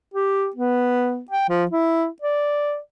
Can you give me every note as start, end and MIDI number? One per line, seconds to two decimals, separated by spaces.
0.14 0.48 67
0.56 1.21 59
1.31 1.46 79
1.49 1.65 53
1.71 2.07 64
2.22 2.78 74